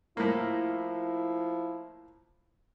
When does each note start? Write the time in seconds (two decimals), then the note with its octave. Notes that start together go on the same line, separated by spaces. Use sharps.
0.17 A2 F3 A#3 E4